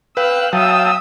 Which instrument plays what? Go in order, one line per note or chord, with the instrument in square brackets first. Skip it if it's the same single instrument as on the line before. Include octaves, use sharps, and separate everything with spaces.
[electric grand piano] B4 [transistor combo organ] F5 G5 [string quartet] E6 F#6
[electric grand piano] F#3 [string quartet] E5 D#6 E6 [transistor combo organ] F5 G5 A5